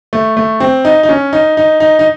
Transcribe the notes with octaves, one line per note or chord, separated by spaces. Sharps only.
A3
A3
C4
D#4
D#4
C#4
D#4
D#4
D#4
D#4